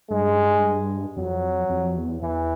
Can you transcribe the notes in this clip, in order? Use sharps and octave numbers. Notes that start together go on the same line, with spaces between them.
G2 G#3
F2 F#3
F2
E2
E2 E3